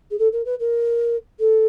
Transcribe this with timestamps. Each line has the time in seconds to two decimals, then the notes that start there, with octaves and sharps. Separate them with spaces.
0.11 G#4
0.19 A4
0.32 A#4
0.45 B4
0.59 A#4
1.39 A4